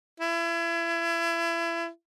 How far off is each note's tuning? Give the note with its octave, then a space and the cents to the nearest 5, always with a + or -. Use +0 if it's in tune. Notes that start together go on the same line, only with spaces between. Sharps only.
E4 +30